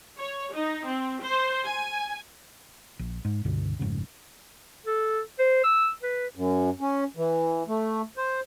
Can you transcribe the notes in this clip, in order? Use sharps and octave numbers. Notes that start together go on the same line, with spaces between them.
C#5
D#4
C4
C5
G#5
A#1
G#2
C#2 G2 B2 D3
F1 G#2 C#3
A4
C5
E6
B4
F#2
C#4
E3
A3
C5